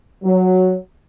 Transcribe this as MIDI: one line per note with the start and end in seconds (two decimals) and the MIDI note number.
0.24 0.75 54